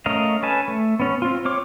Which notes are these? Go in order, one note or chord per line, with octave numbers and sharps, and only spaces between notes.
A3 C#4 A#4 D#5 F5
C#4 A4 B4 G#5 A5
A3
B3 C#4
C4 F4
C4 C#5 D6 F6